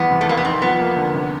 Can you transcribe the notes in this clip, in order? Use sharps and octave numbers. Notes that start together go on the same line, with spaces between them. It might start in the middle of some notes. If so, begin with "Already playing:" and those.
Already playing: E2 E3 B3
C3
A3
F1 A#3
B3
C4 D#4
F3 B3
A#3
D3
C3